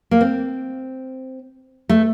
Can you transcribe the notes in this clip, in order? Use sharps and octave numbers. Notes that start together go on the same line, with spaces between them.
A#3
C4
A3